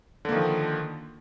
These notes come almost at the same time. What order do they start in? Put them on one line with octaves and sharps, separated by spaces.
D3 A#3 D#3 F3